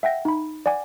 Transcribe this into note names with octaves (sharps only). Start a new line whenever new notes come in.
E5 F#5 G5 A#6
D#4 B5
D5 F#5 G#5 D6